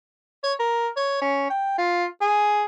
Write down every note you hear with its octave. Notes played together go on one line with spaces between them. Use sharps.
C#5
A#4
C#5
C#4
G5
F4
G#4